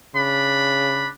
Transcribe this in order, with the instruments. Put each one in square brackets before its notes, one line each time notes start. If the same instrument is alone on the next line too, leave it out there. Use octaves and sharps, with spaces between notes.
[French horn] C#3 [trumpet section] D4 B5